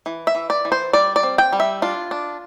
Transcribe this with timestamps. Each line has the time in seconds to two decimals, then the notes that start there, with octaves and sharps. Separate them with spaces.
0.06 E3
0.27 E5
0.35 E3
0.50 D5
0.65 E3
0.72 C5
0.93 G3 D5
1.16 D5
1.23 C4
1.38 G5
1.53 G3
1.60 E5
1.82 D4 F4
2.11 D4